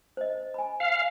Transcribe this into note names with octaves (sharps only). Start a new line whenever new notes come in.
C5 D#5
G#5 B5
F5